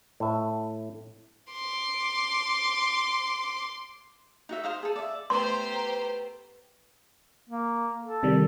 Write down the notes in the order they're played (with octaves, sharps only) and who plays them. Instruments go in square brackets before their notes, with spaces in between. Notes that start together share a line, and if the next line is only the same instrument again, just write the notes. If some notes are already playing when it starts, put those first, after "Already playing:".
[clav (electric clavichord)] A2 E5
[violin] C6 D6
[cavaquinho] D#4 F#4 E5
C5 F5 D#6
G#4 A4
D5 E5
[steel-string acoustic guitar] A3 B3 B4 [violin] G4 C5 [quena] A#5 [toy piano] C6
[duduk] A#3
A4
[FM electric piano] C3 D#3 G3